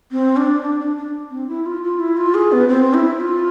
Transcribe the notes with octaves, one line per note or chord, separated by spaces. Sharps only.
C4
D4
D4
D4
D4
C4
E4
F4
F4
E4
F4
G#4
B3
C4
E4
F4